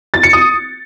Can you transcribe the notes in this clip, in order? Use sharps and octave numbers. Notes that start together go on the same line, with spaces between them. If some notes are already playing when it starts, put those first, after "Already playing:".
A6
C#7
D#6